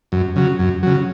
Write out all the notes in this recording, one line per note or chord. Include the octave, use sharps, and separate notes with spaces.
F#2
C#3 F#3
F#2
C#3 F#3